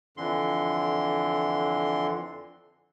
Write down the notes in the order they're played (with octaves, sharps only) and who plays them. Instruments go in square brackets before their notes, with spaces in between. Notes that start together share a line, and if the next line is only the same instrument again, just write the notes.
[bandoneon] F2 D3 E3 C6